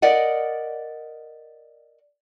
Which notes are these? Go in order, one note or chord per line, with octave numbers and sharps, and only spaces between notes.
A#4 D5 D#5 F#5